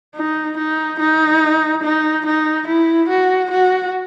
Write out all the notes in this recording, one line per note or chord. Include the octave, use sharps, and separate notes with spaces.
D#4
D#4
D#4
D#4
D#4
E4
F#4
F#4